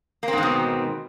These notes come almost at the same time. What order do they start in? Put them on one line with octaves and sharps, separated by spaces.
A#3 C4 G#2 D#3 B2